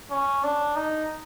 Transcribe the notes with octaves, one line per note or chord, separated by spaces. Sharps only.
C#4
D4
D#4